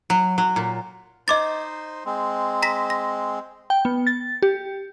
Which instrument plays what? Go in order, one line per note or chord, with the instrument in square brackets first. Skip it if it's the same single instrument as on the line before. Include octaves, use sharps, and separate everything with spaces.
[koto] F#3
F#3
A#2
[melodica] D#4 C5 [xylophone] D#5 D6 A6
[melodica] G#3 C4
[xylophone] A#5 A#6 B6
A#6
[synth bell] G5
B3
A6
G4